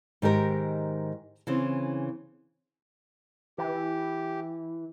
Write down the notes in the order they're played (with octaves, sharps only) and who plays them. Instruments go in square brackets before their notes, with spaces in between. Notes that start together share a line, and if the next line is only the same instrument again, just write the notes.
[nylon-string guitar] G#2 D#3 G4 A#4
C#3 E3 C4
[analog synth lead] E3 [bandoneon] G4